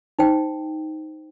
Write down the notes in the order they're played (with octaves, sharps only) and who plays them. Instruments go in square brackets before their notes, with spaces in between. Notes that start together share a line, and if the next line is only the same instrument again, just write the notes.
[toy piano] D#4 C5 G5